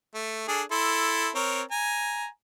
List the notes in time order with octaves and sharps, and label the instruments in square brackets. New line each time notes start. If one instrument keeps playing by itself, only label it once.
[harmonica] A3
D4 G#4 A4
E4 A4 C6
C4 A#4 C#5
G#5 A#5